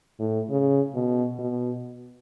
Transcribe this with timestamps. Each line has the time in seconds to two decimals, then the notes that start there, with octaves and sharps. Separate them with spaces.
0.19 A2
0.49 C#3
0.95 B2
1.39 B2